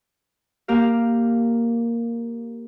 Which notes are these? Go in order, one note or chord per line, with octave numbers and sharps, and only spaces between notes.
A#3 G4 A#4 F5